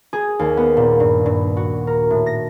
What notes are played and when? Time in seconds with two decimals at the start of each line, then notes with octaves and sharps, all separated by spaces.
0.13 G#4
0.39 D#2
0.57 B3
0.77 A#2
1.00 G2
1.26 G2
1.57 F#4
1.87 A#4
2.10 A2
2.26 A#6